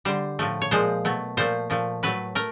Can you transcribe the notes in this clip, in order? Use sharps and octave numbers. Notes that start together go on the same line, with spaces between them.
D3 G3 C5
A2 F3 A3
C#5
A#2 F3 G#3 C5
B2 F#3 A3
A#2 F3 A3 C5
A#2 F3 A3
A2 F#3 A3 B4
A3 A#4